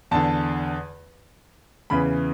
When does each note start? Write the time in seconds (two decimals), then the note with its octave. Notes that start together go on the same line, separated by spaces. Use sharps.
0.11 E2 D3 A5
1.90 E2 C#3 E3 B5